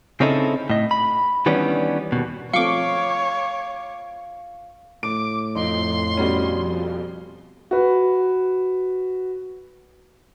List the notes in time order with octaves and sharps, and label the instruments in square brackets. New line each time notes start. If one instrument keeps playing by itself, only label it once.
[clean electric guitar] C#3 C4 C#4 D#4 E4 A4
A2 D#5
B5
D#3 E3 G3 B3 C#4 D4
D#2 B2
[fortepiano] F3 A3 C4 [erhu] C#5 [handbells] F5 [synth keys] C#6 D6
[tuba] A2 [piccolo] D6 [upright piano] D7
[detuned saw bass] F2 [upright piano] D#4 [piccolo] C6
[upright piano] B2 G3 C#4
[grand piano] F#4 B4